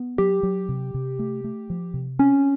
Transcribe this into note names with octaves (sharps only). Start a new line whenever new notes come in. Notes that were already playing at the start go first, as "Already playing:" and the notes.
Already playing: B3
F#3 G4
F#3
C3
C3
A3
A3
F3
C3
C4 C#4